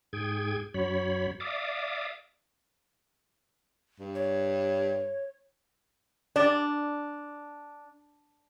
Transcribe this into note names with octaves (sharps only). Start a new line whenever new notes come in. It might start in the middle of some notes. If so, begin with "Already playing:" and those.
G#2 G#4 G5 G#6
F#2 F#3 C#5 B5
D5 E5 F5 D6 D#6
G2
C#5
D4 D5